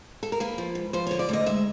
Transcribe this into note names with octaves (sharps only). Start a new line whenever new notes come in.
A4
A#4
A#3 B4
F3
G#2
F3 C5
D3 C#5
D5
D2 D#5
G#3 E5